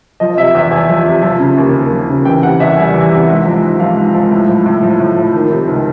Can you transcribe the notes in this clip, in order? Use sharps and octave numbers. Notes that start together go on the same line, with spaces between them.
F3 D#5
C3 E5
E2
E2 G#5
F3
C3
F3
C#3
D#2
D#2
F3
C#3
E3 G5
C3 F#5
E2 E5
G3 G#5
E3
C3
G#2
F3
G#2
F3 F5
G#2
F3
A2
F3
A2
F3
A2
F3
D#3
C3
C#2